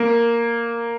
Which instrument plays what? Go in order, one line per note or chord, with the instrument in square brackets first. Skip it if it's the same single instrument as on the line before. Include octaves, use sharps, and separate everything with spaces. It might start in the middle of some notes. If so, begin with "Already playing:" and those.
Already playing: [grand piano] A#3